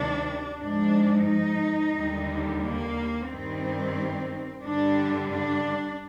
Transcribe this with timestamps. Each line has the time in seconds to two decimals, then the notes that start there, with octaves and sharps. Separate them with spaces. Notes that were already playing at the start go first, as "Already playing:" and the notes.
Already playing: D2 C3 D#3 G3 D4
0.59 G#2 F3 D4
1.27 D#4
1.94 D#2 D3 G3
2.62 A#3
3.28 G2 D#3 G3 C4
4.63 G2 D3 G3 D4
5.30 D4